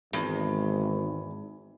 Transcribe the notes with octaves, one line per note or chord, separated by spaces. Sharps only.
G#1 E2 G#2